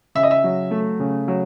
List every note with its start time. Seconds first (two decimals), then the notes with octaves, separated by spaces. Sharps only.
0.15 C#3 E5
0.23 D#5
0.31 E5
0.44 F#3
0.71 A3
0.99 C#3
1.28 F#3